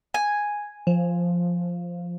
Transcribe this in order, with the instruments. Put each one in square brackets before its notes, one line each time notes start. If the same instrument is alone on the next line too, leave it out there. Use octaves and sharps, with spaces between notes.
[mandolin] G#5
[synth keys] F3